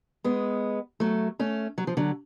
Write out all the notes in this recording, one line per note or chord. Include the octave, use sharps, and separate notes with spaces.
G#3 B3
F#3 A3
A3 C#4
F#3
F3
D3 F#3